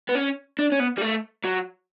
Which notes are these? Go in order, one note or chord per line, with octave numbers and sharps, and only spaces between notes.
B3
C#4
D4
C#4
B3
G3
A3
F#3